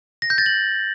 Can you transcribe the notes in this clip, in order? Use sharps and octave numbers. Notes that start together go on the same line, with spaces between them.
A#6
G6
A6
F#7